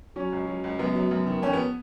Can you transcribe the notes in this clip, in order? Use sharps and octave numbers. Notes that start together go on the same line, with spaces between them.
F#3 C#4
C#2
F#3
C#2
F#2 B3
F#3
F#2
D#3
F2 C#4
B3